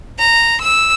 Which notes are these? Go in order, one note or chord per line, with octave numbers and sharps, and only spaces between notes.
A#5
E6